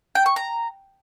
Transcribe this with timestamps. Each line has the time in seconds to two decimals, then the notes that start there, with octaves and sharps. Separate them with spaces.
0.15 G5
0.26 C#6
0.36 A#5